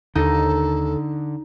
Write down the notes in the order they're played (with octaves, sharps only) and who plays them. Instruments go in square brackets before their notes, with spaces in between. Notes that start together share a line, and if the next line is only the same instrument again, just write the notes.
[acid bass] D#2 [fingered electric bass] D3 [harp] D#4 [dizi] A4